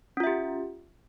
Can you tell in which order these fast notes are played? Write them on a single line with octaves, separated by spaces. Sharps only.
C#4 F4 E5 G4